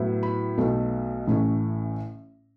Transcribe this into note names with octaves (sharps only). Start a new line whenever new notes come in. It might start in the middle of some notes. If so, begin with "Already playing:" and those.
Already playing: A2 F#3 B3 E4
B5
B1 B2 A3
A1 A2 A3 C#4